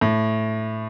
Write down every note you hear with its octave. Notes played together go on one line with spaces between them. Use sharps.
A2